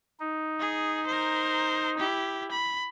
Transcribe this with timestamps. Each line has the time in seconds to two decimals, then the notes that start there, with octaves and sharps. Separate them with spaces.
0.20 D#4
0.60 G#4
1.06 A#4 C5
1.97 E4 G4
2.51 B5